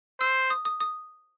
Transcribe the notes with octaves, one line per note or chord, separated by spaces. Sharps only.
C5 E6
D#6
D#6
D#6